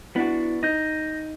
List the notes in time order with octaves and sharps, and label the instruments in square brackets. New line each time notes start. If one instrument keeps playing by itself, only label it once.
[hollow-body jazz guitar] B3 D4 F#4 [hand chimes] E4
[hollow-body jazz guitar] D#4 [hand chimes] G6 A#6